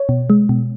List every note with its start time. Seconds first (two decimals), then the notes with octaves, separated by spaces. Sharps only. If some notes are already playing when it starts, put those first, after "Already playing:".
Already playing: C#5
0.09 B2
0.30 G#3
0.49 B2